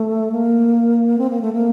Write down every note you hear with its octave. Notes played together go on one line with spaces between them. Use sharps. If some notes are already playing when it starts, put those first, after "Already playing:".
Already playing: A3
A#3
C4
A#3
A3
A#3